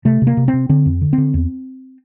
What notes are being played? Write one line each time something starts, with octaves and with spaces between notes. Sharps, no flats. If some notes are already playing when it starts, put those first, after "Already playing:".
C3 A3
C3
A#3
C3
C4
C3
D3 C4
F2
D3
C4
D3
E2